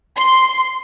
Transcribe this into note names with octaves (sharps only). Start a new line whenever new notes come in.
C6